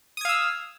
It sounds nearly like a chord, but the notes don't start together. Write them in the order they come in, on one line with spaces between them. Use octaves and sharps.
D#6 G#6 F5 E6